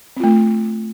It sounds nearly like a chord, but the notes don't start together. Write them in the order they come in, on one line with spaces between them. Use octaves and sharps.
C4 F4 A3